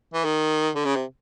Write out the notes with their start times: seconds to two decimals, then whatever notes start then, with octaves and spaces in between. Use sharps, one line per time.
0.14 E3
0.24 D#3
0.75 D3
0.85 C#3
0.96 C3